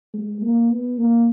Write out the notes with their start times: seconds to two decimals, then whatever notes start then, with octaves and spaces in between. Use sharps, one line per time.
0.14 G#3
0.42 A#3
0.70 B3
0.98 A#3